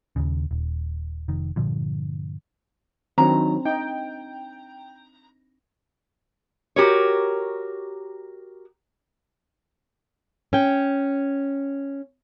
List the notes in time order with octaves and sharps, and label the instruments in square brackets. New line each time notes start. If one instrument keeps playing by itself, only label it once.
[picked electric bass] D#1 G#1 D#2 C#3
D#1
F1 D#3
G2 A#2 D3 F3
[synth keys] D#3 F#3 [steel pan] C4 D4 [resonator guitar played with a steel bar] A#5
[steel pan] D#4 [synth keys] G5
[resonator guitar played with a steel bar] F#4 G4 A#4 C#5
[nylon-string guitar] C#4 G5